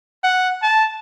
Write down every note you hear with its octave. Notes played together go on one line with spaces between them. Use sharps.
F#5
A5